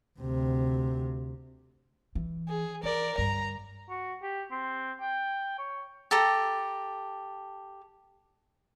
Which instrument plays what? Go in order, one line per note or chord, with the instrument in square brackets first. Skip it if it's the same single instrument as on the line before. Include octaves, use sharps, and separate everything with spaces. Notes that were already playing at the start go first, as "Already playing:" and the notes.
[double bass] D2 C3
[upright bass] E3
[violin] G#4
[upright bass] E3 [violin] A#4 D5
[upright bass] G2 D3 [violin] A#5
[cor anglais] F#4
G4
C4
G5
C#5
[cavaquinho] G4 A4 A#5